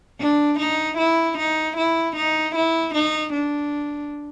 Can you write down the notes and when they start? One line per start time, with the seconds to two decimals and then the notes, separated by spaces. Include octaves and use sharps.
0.20 D4
0.59 D#4
0.98 E4
1.38 D#4
1.77 E4
2.16 D#4
2.55 E4
2.94 D#4
3.33 D4